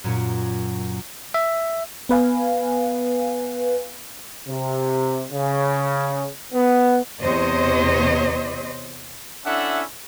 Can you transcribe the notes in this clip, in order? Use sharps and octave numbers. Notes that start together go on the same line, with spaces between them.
F#2 A#2 C#4
E5
B3 B4 F5 G#5
C3
C#3
B3
E2 C3 C5 C#5 D#5
C#4 D4 E4 A4 E5 F#5